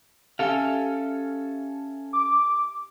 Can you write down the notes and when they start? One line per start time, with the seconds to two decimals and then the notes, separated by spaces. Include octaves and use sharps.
0.39 C#4 G4 A4 E5 F5 G#5
2.13 D6